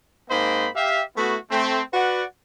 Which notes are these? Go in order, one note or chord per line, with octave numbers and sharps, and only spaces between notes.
G#2 A#3 C4 C5 D#5 B5
G4 E5 F5
A3 B3 E4 F#4
A3 C4
F#4 B4 D5 F#5